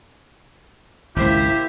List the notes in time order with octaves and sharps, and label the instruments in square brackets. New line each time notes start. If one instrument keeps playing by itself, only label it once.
[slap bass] G#1 C#2 [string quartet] A#3 C5 E5 [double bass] E4 [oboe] G4